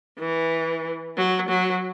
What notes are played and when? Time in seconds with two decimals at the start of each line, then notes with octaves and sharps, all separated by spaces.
0.19 E3
1.17 F#3
1.49 F#3